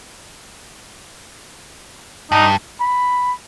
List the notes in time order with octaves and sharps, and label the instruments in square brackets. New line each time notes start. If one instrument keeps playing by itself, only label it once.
[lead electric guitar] G2 [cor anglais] D#4
[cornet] B5